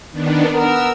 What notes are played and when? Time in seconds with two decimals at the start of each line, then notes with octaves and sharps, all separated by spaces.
0.12 D#3 B3 D4
0.54 B3 A#4 E6